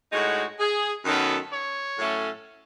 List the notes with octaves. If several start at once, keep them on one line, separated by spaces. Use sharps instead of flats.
A2 G#3 D#4 F#4
G#4
F#2 D#3 F#3 B3 A4
C#5
A2 F#3 A3 C#4